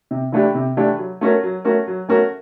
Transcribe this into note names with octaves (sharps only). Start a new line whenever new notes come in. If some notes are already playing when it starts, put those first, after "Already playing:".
C3
E3 A3 D4 G4
C3
E3 A3 D4 G4
F#3
A3 C#4 F#4 A#4
F#3
A3 C#4 F#4 A#4
F#3
A3 C#4 F#4 A#4